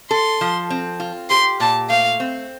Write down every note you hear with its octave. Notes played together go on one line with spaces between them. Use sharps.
A4 C6
F3
C4
F4
G4 C6
A#2 A5
A3 F5
C4